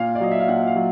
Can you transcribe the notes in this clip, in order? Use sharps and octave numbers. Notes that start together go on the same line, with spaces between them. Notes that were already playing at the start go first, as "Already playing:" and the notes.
Already playing: A#2 F5
D5
F#3 D#5
E5
F5
A#2 F#5
F5
F#3